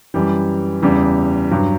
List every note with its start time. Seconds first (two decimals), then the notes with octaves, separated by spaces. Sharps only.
0.14 F#2 E3 G3
0.82 E2 C#3 G3
1.51 G2 F#3